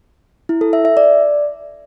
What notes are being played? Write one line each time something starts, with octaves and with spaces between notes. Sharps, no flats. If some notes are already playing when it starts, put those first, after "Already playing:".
E4
A4
E5
E5
D5